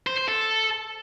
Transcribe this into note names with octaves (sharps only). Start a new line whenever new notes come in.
C5
C5
A4